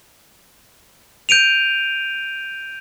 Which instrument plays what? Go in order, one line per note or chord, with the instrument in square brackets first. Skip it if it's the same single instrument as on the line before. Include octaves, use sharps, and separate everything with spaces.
[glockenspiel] G6 D7 D#7 F7